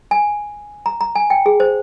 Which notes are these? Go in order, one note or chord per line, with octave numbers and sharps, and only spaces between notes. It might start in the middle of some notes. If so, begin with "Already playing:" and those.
G#5
A#5
A#5
G#5
G5
G#4
C5